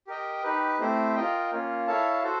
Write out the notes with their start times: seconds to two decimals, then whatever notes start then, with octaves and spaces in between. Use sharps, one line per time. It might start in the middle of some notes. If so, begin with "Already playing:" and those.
0.07 G4 A#4 D#5 G5
0.43 D#4 G4 B4
0.79 A3 C4 E4 G4 C5
1.15 F4 A#4 D#5 G5
1.51 A#3 C#4 F4
1.87 E4 A4 C#5 F5 A5
2.23 F#4 A4 C5